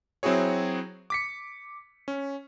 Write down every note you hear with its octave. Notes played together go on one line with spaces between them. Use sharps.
F#3 C4 E4 F#4 G#4 C#5
D6 B6 C#7
C#4